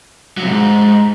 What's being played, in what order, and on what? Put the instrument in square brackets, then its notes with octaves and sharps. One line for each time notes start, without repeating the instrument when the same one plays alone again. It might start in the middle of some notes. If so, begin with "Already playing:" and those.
[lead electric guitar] F#3
C3
G#2